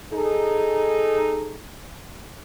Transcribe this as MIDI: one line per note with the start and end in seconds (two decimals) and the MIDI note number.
0.13 1.60 63
0.13 1.60 68
0.13 1.60 69